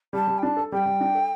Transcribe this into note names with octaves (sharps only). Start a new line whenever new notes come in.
G3 A5
G3
G5
D4 A5
A4
G3 G5
G3
D4
A4